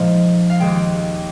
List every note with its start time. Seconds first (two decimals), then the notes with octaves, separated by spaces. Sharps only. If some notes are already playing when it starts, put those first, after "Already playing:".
Already playing: A#2 F3 G#3 D#4 F5
0.50 F5
0.60 D#2 D#3 G#3 G5